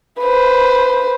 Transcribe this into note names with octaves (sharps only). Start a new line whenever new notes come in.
B4 C5